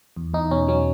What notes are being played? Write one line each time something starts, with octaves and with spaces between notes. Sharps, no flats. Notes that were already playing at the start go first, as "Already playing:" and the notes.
E2
E2 D#4
B2 C#4
F#3 C#4